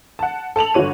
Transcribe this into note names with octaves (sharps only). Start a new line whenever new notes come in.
F#5 A5
A4 A5 F7 F#7
G1 D3 F#3 F#4 C#5 D#7